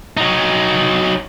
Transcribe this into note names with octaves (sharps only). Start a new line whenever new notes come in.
F#3 D#4